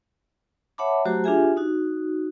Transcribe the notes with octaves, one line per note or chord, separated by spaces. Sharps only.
C#5 E5 F#5 A5 B5 D6
F#3 A3 F#4 G4 C5 A#5
D4 F4 G4 G#4 E5 G#5
D#4 F#4